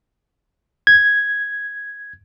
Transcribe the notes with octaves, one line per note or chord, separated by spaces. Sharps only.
G#6